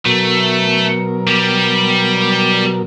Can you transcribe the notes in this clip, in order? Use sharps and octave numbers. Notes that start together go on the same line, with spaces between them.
B2 F#3 A3 A#4
G3 G4